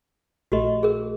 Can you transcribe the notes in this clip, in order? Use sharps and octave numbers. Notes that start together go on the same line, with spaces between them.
A#1 A3 F#4 G4 D#5
G#4 A#4